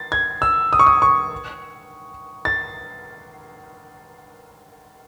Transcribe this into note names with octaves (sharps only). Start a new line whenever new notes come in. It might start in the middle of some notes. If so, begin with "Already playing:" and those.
Already playing: A6
G#6
E6
D#6
C#6
D#6
C#6
A6